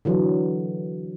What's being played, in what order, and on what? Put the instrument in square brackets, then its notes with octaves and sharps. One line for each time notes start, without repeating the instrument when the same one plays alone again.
[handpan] D3 E3 F#3